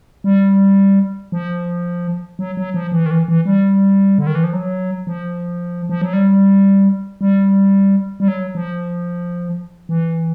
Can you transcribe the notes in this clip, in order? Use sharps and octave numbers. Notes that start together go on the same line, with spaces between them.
G3
F3
F#3
F#3
F3
E3
D#3
E3
E3
G3
D3
D#3
E3
F3
F#3
F3
F3
F#3
G3
G3
G3
F#3
F3
E3